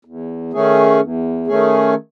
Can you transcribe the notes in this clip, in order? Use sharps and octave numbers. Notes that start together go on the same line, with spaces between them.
E2
D#3 A3 C#4 G#4
E2
D#3 A3 C#4 G#4